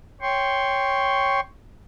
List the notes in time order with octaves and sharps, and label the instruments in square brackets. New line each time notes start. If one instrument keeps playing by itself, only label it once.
[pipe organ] C#5 G5 C6 C#6